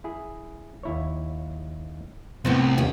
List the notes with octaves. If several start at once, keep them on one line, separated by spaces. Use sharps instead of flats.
E4 G#4
D#2 E4 C#5
C2 A2 B3 C4
D#2 A#2 C#4 G4